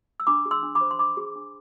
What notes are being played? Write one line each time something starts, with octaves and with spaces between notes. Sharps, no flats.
E6
D4 B5 D6
G#4
C6 E6
D4
B5 D6
C5
C6
D4 B5 D6
G#4
D4